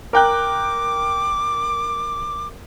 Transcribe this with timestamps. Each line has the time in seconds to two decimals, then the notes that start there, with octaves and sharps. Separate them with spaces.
0.13 A#4 G5 D6 F#6